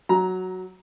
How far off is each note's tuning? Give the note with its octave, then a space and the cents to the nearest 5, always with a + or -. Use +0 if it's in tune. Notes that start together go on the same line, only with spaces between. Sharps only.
F#3 +0 A#5 +10